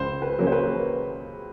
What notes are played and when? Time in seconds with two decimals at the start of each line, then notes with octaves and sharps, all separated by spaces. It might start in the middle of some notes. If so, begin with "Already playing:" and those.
Already playing: C#2 C5
0.22 B4
0.38 C#3 F#3 A#3 C#4
0.47 C5
0.52 B4